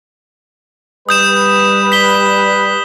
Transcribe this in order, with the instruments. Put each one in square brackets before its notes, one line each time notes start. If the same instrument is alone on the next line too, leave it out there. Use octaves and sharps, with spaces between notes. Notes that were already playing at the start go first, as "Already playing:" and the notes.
[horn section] G3 B4 [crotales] D#6 G6 E7
[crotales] B6 G7